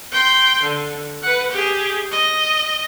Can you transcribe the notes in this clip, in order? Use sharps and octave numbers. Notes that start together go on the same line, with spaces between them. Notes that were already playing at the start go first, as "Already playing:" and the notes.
G5 C6
D3
B4 F#5
G4 G#4
D#5